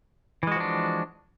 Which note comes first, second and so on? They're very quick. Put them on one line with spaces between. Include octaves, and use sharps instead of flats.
E3 G#3 F#4 F3 D4